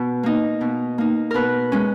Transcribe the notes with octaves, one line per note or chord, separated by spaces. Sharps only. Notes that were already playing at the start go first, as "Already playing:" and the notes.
Already playing: B2
A#3 D#4
B2
A#3 D#4
B2 A#4 B4
G#3 C#4